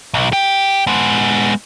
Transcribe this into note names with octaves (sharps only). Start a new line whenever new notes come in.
B1
G4 G5
G#3 B3